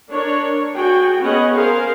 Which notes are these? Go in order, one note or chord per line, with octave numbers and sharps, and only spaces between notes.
D4 A#4 C#5
F#4 G#4 G5
B3 C#4 G#4 D#5 F#5
G#4 A#4 C5 F5